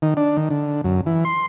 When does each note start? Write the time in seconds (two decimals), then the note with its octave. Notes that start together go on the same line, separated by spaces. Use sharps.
0.02 D#3
0.17 D4
0.37 D#3
0.50 D3
0.84 F#2
1.06 E3
1.25 C6